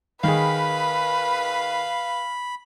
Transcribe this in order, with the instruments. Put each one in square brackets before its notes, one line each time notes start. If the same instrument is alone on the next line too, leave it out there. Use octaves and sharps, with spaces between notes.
[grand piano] D#3 G#4 [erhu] B4 [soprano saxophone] F5 [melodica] B5